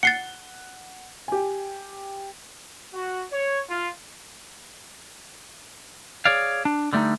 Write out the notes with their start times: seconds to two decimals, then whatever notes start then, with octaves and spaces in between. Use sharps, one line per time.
0.03 F#5 F#6 A6 C7 C#7 G7
1.28 G4 G#5
2.93 F#4
3.32 C#5
3.70 F4
6.25 G#4 C#5 D5 F5
6.65 D4
6.93 D3 G3 A3 C4 D#4